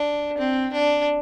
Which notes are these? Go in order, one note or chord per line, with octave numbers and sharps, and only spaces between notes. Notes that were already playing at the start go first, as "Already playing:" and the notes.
Already playing: D4
C4
D4